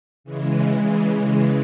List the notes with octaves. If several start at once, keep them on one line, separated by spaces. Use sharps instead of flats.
C#3 E3 G#3